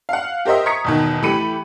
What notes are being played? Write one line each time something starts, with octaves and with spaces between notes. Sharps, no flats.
F5 F#5
G4 A#4 C5 D#5 E5
A#5 C#6 D#6 G#6 B6 C#7
E2 B2 D#3
E3 A3 G4 B5 C#7 D#7